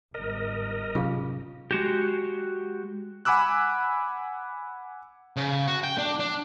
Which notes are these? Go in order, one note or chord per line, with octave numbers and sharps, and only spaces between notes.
G1 G#2 A#4 D#5
C3 F#3 C#4 F4 G#4 F5
G#3 F#4 G4
F#5 G#5 B5 D6 E6 F#6
C#3
F#4
G5
D4
D4